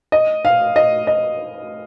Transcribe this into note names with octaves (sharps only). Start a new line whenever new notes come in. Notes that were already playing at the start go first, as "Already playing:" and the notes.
D#5
F5
D#5
D#5